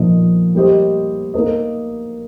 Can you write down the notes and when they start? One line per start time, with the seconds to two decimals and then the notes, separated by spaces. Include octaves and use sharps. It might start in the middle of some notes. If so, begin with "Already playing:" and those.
Already playing: A#2 F3 D#4 C5 D#5
0.55 G3 A#3 G4 C5 D#5
1.34 A#3 D#4 A#4 D#5